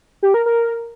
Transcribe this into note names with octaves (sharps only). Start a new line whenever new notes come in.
G4
A#4
A#4